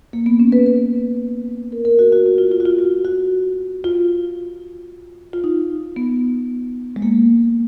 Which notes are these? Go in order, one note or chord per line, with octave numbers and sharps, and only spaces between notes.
A#3
B3
C#4
B4
B4
A#4
A#4
F#4
F#4
F#4
F4
F4
F#4
F4
F#4
F#4
F4
F4
D#4
B3
G#3
A#3